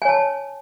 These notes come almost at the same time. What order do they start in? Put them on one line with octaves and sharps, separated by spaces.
G#5 C#5 A5